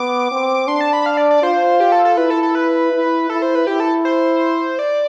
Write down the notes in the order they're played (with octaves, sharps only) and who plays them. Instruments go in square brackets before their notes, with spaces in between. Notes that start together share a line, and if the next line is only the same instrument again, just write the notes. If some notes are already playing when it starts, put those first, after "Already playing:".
Already playing: [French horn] B3 [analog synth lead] D6
[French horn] C4
[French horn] D4 [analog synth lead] C6
[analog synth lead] A5
B5
F5
D5
D5
[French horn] F4 [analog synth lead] C5
[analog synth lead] G4
A4
A4
[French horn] E4 [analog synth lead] B4
[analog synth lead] A4
A4
B4
[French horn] E4
[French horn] E4 [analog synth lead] A4
[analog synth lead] C5
B4
[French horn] E4 [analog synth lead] G4
[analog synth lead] A4
C5
D5